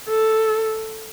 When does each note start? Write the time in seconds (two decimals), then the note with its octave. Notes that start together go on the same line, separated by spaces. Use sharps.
0.09 A4